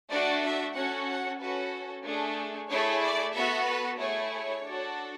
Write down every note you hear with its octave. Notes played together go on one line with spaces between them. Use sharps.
A3 D4 F#4 D5
E5
C#4 F#4 A4 F#5
F#5
C#4 F#4 A4 B4
A3 D4 G#4
A3 E4 G#4 C#5
D5
B3 F#4 A4 E5
B4
A3 E4 G#4 C#5
C#5
D4 F#4 A4